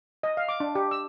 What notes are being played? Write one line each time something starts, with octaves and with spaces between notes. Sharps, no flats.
D#5
F5
D6
D4
G4
E6